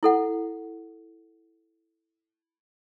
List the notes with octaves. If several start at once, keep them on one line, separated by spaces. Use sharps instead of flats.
E4 A4 F#5